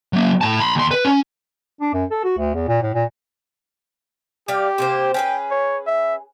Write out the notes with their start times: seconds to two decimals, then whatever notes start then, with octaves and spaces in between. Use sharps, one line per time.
0.13 F#3 A#3
0.41 A2 A5
0.60 B5 C6
0.76 D#2 C6
0.91 B4
1.05 C#4
1.81 D4
1.93 F#2
2.11 A4
2.24 F#4
2.38 D2
2.54 E2
2.68 A#2
2.82 A2
2.94 A#2
4.48 G3 G4 F5
4.78 C3 A#3 C5
5.14 C#4 G#4 B4 G5
5.51 C#5
5.87 E5